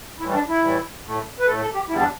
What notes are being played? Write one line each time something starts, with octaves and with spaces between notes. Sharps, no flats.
A2 E3 G3 E4
D4
E4
A2 E3 G3
A2 A3
B4
A2 A3 A4
A4
G4
E2 D3 G3 E4
D4